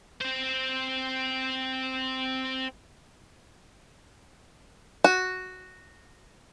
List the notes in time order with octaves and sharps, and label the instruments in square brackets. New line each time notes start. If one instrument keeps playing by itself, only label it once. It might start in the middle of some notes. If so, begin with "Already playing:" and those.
[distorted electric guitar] C4 C5
[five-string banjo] F#4